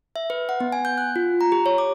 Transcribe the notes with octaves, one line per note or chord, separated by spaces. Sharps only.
E5
B4
F#5
B3
G#5
G6
F#6
F4
A#5
G4
C#5
D6